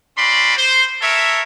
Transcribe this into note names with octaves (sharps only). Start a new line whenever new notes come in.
C#4 F#4 D5 B5 C6
C5
A4 A#4 C#5 E5